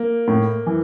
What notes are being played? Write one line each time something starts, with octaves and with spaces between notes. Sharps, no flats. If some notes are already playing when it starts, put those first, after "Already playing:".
Already playing: A#3
A2
E3